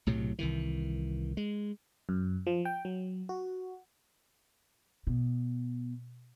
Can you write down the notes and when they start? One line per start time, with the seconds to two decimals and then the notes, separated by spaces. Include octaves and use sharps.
0.06 B1 A2 C3 F#3
0.39 C2 D#3 E3
1.37 G#3
2.09 F#2
2.47 F3
2.65 G5
2.85 F#3
3.29 F#4
5.07 B2